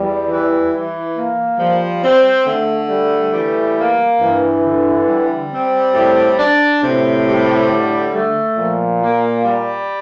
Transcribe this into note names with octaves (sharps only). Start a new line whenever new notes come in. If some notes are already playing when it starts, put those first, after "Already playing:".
Already playing: E2 G3
E3
E3
A#3
F3 G3
C4
D3 A3
G3 A3
E3 G3
A#3
G2 E3
D3
G3
C4
A2 G3
D4
A2 C3
G3
D3
A3
A#2 F3
A#3
G3